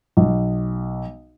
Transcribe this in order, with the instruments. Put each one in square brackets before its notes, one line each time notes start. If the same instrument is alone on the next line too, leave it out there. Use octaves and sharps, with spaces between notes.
[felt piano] B1